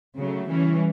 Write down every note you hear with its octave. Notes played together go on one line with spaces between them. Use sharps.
C#3 F#3 A3
E3 G3 C#4